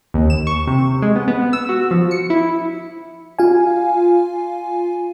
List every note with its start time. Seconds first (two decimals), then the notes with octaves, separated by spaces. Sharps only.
0.14 D#2
0.30 E7
0.47 C#6
0.67 C3
1.02 G#3
1.15 B3
1.28 B3
1.53 E6
1.69 F#4
1.91 F3
2.11 C#7
2.30 E4
3.39 F4 F5 G#5